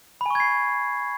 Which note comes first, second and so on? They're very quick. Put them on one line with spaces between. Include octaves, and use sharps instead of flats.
B5 G#5 C#6 G#6 C7